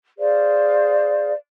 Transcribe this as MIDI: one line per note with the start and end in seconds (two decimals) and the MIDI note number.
0.18 1.33 68
0.18 1.33 72
0.18 1.33 74
0.18 1.33 77